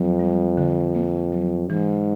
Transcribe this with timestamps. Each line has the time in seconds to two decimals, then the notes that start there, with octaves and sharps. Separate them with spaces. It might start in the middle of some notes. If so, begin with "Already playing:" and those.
Already playing: F2 F#3
0.20 G3
0.57 D3
0.95 A#3
1.32 F#3
1.70 G#2 E3